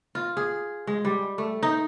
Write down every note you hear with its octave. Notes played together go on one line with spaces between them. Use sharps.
F4
G#4
G#3
G3
A3
D#4